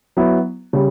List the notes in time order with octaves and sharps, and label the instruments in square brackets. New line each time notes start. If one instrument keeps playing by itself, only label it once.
[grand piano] F#3 B3 E4
C#3 G3